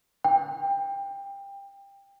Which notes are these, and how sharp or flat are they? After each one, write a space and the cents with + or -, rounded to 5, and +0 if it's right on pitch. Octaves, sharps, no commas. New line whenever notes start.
G5 +20